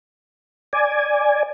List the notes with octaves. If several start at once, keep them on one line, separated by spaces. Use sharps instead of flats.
D5 G#5